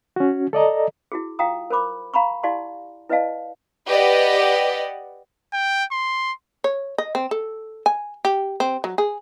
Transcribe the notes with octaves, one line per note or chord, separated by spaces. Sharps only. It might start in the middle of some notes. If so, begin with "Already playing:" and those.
C#4 F#4
A4 D5 D#5 A#5
E4 F#4 G#4
F4 F5 G5 A#5 D#6
A#4 C5 B5 D6
F5 A#5 B5 C#6
E4 G4 D5 F5 A5 C6
E4 B4 D5 D#5 F5 A5
G4 B4 D5 D#5 F#5
G5
C6
C#5
D#5
C4
A4
G#5
G4
C4
F#3
G#4